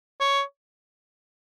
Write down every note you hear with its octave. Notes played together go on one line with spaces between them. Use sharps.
C#5